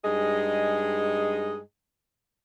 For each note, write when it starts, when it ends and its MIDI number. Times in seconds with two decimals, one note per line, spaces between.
0.04 1.59 43
0.04 1.59 56
0.04 1.59 63
0.04 1.59 68
0.04 1.59 75